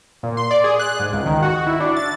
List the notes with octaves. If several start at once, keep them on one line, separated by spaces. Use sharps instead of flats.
A#2
C6
D5
G#4
F#6
G#2
C#2
D#3
F#4
E4
D4
A6